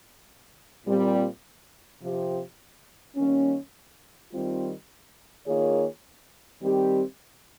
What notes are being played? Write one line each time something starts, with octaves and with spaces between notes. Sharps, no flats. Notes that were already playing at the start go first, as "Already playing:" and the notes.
A#2 G3 C4
C3 F3 C4 G4
D#3 G3 A#3 C#4
D#3 G3 C4 F4
D#3 A#3 F4 G#4 C#5
D#3 G3 C4 G4